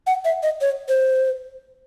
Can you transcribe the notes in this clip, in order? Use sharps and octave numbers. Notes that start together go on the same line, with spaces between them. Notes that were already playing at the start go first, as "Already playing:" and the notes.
F#5
E5
D#5
C#5
C5